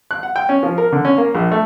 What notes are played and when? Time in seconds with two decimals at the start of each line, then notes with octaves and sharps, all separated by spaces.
0.11 F#6
0.23 F#5
0.36 G5
0.49 C#4
0.63 F3
0.78 A#4
0.92 D3
1.05 C#4
1.18 A#3
1.35 A#1
1.52 A3